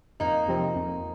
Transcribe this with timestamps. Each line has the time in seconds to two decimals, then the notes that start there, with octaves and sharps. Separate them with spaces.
0.20 F2 A#3 D#4
0.48 C3 F3 C4
0.75 F2